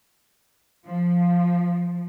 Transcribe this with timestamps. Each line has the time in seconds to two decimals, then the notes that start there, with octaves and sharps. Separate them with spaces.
0.86 F3